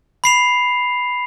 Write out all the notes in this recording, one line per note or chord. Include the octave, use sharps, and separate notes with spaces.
B5 C7 F7